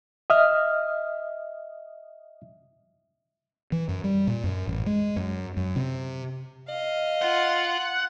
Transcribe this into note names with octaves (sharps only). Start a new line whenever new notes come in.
D#5 E5 D#6 F6
E3
F#2
G3
A#2
F#2
A1
G#3
F#2
F#2
C3
D#5 F5
F4 F#5